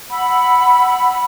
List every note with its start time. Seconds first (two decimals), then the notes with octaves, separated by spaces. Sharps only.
0.09 F#5 B5 E6